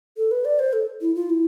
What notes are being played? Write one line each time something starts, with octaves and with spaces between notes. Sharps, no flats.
A4
B4
D5
C5
A4
E4
F4
E4